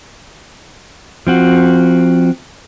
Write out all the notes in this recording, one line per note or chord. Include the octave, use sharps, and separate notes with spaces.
F3 C4 F#4